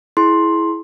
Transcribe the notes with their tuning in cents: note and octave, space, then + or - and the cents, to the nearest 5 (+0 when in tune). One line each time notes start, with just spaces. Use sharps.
E4 +0 G#4 +30 C6 +10